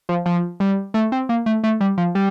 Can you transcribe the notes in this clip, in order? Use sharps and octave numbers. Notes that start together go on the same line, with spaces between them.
F3
F3
G3
A3
C4
A#3
A3
A3
G3
F3
G3